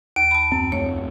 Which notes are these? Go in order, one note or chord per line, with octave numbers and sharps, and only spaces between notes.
D#2 D7
A5 B5
F#2 C4
C#2 A3 C4 C#5